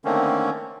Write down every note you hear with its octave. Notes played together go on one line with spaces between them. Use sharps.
D3 D#3 A3 A#3 C4 C#4